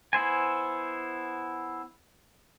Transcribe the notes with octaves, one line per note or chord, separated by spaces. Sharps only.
B3 E4 C5 G#5